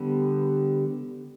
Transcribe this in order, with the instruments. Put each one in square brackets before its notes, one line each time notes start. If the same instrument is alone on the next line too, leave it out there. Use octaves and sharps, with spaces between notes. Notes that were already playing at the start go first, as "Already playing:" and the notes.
Already playing: [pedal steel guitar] D3 G3 B3